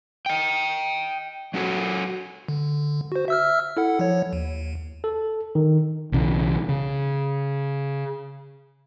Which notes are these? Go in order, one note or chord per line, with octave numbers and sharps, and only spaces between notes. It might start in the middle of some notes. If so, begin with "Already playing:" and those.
D#5 G5
F#3 C#4 F#4 A4
D3
F#4 C5
E5 E6 F6
E4 A4 F#5
F3 C#5
D#2
A4
D#3
B1 C#3 E3
C#3